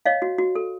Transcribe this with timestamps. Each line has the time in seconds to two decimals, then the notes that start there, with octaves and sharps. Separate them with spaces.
0.06 C#5 D#5 F5
0.22 F#4
0.38 F#4
0.55 A4